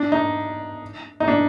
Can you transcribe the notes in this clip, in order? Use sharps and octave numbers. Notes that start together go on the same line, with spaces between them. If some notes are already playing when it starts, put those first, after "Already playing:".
Already playing: D4
D#4
D#4
D4